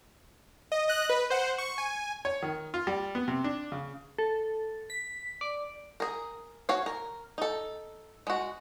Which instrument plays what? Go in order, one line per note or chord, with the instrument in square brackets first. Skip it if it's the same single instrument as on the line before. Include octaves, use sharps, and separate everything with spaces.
[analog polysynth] D#5
D#5 F#6
B4
C5 F#5
C#6
G#5
[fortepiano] C#5
D#3
F4
G3
B3
C3
D4
C#3
[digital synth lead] A4
B6
D5
[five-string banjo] G#4 A#4
F#4 C#5 F5
A#4
D#4 A4
G#3 F#4